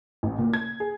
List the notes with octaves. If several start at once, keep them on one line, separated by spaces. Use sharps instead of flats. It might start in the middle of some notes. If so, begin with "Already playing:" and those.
A1
A#2
G#6
G#4